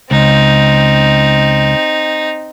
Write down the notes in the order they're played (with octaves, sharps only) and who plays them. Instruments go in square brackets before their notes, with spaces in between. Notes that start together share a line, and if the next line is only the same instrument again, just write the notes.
[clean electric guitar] C#2 [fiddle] C4 D#4